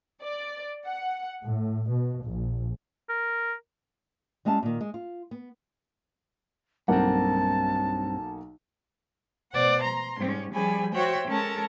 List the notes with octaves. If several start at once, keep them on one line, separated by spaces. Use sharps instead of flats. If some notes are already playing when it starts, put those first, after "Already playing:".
D5
F#5
A2
B2
A#1
A#4
G3 G#3 C#4 E4 A5
A#2 D#3
G#3
F4
B3
B1 G2 A#3 C4 F#5 A5
B2 C5 D5 F#5
A#5 C6
G#2 G3 C#4
F3 G3 C#4 G#4 G#5 B5
F#4 C5 C#5 E5 G5
G#3 C#4 A4 A#4 A5 A#5